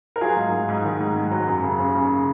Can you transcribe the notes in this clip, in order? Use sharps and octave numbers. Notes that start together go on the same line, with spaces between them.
A#4
F#3 F4 G#4
G#2
G#2
G#2
D#3
G#2
G#2
F#3
F#2
C#3
C#3
C#3